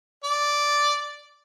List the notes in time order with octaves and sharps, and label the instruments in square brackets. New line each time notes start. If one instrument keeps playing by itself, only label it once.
[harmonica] D5